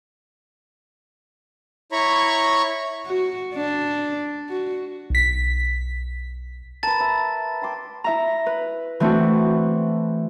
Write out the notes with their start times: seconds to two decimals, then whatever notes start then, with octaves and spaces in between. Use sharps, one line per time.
1.92 E4 C#5 A#5 B5 C#6
3.06 F#4
3.54 D4
4.49 F#4
5.10 B1 B6
6.83 A#4 B4 A5 A6
7.00 E5
7.62 G5 C6 D6
8.04 E4 E5 A#5
8.46 B4
9.00 E3 A3 C4 D4 E4 F#4